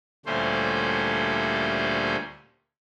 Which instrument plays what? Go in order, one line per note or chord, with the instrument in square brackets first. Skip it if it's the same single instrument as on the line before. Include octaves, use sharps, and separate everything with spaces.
[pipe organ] D2 A#2 G3 A3 C#4 C5